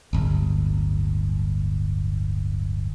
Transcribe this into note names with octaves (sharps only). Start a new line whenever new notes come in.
D1 G1